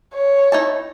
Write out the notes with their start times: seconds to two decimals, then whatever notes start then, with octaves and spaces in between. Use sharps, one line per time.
0.14 C#5
0.52 D#4 E4 A5